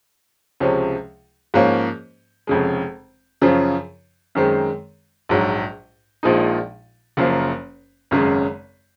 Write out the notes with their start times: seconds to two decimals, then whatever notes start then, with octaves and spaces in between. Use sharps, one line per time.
0.60 C#2 C3 F3 G#3 C#4
1.54 G#2 F3 A#3 C#4
2.47 F1 F2 C#3 G#3
3.42 F#2 C#3 F3
4.35 F#2 D#3 G#3 C4
5.29 A#1 G#2 F#3
6.23 A#1 A#2 F3 G#3 D#4
7.17 F#1 F#2 F3 A#3
8.11 G#1 F#2 C#3 G#3